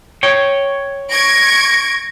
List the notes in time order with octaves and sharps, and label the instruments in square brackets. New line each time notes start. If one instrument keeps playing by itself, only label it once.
[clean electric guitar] C#5 G5
[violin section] C#6 G#6 D7 [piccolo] A#6